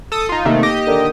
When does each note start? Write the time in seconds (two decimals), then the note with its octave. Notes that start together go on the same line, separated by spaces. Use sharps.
0.12 A4 D#6
0.29 D#4 F4
0.45 C3 D#3 A3 A#3 D#4
0.63 G4 D#5
0.87 D3 D#3